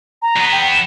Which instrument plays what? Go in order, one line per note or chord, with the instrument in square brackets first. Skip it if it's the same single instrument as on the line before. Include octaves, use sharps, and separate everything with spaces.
[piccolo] A#5
[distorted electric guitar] E2 B3
[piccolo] G5
E7